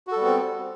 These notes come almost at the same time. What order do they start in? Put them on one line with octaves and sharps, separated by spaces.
F#4 A4 G3 B3 C4